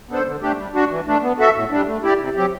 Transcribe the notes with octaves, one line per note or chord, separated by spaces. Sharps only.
B3 D4 A4 C5
D3
A3 D4 G4
G3
D4 F#4
E3
A3 D4
B3
F#4 A4 E5
A2
G3 D4
A3
E4 G4 D5
C3
F#3 C4 G4